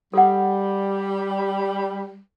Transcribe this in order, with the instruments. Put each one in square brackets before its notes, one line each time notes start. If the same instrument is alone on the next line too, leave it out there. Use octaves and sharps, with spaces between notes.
[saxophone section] G3 [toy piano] A4 F#5